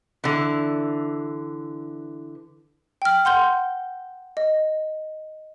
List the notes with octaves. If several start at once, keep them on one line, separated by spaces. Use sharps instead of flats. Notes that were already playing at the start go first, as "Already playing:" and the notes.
D3 E3
G5 F6
F#5 C6 G6 G7
D#5